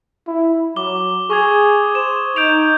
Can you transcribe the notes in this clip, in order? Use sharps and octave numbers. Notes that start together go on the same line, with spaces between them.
E4
F#3 D6 G7
G#4 C#6 D#6 G#6
C5 E7
D#4 G6 D7 F7